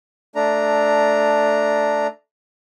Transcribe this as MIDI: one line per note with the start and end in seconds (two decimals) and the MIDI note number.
0.35 2.07 57
0.35 2.07 62
0.35 2.07 82